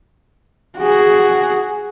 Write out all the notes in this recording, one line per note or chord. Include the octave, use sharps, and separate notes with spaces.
F#4 G#4